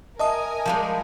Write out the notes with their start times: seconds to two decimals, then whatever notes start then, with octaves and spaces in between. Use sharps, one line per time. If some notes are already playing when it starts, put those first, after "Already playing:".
0.19 A#4 D#5 E5 G#5 A5 D#6
0.66 F3 G3 G#3